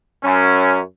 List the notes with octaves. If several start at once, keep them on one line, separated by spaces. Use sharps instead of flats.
F#2 C#4